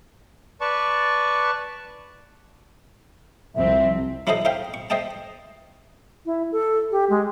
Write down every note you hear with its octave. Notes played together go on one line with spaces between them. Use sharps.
B4 D5 A5 C#6
C2 F2 C4 E5
F#3 E4 F#4 A4 C5 D#5
D#4 C5 E5 F5 G5
C#6
C5 D#5 E5 G5 A5
E4
A4
G4
G#3